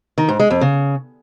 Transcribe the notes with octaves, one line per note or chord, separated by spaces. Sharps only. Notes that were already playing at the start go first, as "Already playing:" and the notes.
D#3
G#2
G#3
F2
C#3